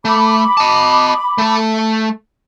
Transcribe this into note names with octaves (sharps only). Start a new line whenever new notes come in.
A3 B5 D6
D#5 A5
A3 A4